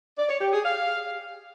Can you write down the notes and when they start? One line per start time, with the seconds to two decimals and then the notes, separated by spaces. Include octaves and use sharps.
0.17 D5
0.29 C#5
0.41 G4
0.53 G#4
0.64 F5